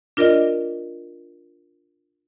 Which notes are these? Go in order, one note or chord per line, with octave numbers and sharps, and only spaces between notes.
D4 F4 A#4 D5 D#5